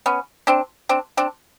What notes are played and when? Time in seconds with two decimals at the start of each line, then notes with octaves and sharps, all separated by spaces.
0.06 B3 C#4
0.47 C4 D4
0.89 C4 D4
1.17 C4 D4